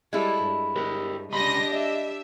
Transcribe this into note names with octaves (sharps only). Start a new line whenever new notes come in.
G3 G#3 E4 A4
G2
G4 A#4
C#2 D4 G4 D#5 B5 C6 A#6
D#5 E5